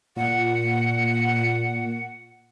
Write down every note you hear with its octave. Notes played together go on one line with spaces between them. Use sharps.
A#2 F#5